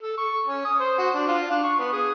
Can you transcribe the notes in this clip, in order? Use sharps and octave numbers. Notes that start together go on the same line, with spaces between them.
A4
C#6
C#4
D#6
C5
F#4
D4
F4
D4
C#6
B3
G#4